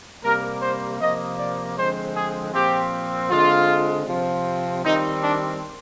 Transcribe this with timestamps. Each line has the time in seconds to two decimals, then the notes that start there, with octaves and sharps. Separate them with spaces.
0.23 C3 G3 A#3 A#4
0.62 C5
1.00 C3 F3 A#3 D#5
1.39 D5
1.77 D3 F3 G#3 C4 C5
2.15 G#4
2.53 A#2 F3 C4 G4
3.30 D3 G#3 C4 F4
4.07 C3 F3 C4
4.83 D#3 G3 C4 D#4
5.22 D4